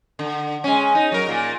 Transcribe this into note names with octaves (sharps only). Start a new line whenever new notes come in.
D3
G#3 C#4
D#4
F#3 A#4
A#2 A#3